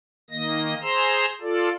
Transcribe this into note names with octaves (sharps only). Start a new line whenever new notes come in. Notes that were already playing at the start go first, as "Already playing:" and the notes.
D#3 A#3 D#5 A#6
G#4 C5 A#5 C6 E6
F4 A4 D5